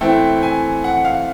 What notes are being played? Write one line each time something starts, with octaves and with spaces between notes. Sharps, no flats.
E3 A3 C4 E4 G5
G#5
F#5
F5